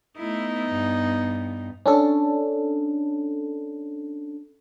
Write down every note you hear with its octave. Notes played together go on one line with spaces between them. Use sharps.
A3 B3 D#4 E4
G2
C#4 D4 A4